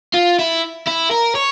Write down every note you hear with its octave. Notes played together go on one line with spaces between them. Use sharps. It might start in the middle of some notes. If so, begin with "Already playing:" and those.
F4
E4
E4
A#4
C#5